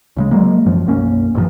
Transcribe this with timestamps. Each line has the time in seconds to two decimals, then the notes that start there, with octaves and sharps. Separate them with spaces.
0.16 C#2 C#3 G#3
0.31 F#3 G#3 A#3
0.66 F#2 F3
0.86 B1 F#2 A#3 C#4
1.35 A#1 G2 D3 F3